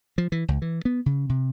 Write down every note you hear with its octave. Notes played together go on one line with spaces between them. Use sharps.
F3
E3
C#2
E3
B3
C#3
C3